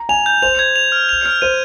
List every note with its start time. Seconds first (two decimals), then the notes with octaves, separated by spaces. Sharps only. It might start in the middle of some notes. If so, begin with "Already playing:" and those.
Already playing: A#5
0.09 G#5 F7
0.26 G6
0.42 C5 F7
0.59 G#6
0.76 F7
0.92 F6
1.09 F7
1.26 F6
1.42 C5 D#7